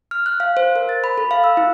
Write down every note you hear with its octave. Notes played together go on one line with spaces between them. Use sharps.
F6
F#6
F5
C5
A#4
A6
B5
A4
F5
E6
E4